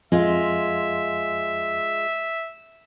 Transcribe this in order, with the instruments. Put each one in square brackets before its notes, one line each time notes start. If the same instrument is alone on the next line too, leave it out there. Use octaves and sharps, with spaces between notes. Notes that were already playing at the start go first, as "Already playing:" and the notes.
[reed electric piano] F2 [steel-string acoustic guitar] G#3 F4 [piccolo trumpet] E5